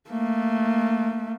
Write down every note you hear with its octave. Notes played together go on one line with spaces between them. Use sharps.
A3 A#3